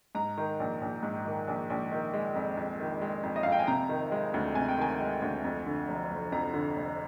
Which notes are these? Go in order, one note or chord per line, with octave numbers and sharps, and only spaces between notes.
G#2 A#5
D#3
A#1
A#1
G#2
D#3
A#1
A#1
D#3
G#3
F2
F2
D#3
G#3
F2
D#5
F2 F5
G5
G#5
C3 A#5
D#3
G#3
D2
C3 G#5
G5
D#3 G#5
G#3
D2
F2
D3
F1
F1
F2 A#5
D3
F1